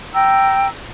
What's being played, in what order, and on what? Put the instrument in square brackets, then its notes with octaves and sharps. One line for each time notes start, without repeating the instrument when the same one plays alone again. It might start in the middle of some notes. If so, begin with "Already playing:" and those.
[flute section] G5 A#5 E6